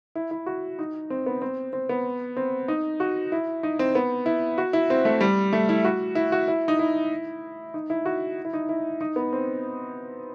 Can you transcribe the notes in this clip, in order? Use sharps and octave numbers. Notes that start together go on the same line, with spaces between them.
E4
E4
F#4
D#4
C4
B3
C4
C4
B3
C4
D#4
F#4
E4
D#4
C4
B3
E4
F#4
E4
C4
A3
G3
A3
E4
F#4
E4
F#4
E4
D#4
E4
D#4
E4
F#4
E4
D#4
E4
D#4
B3
C4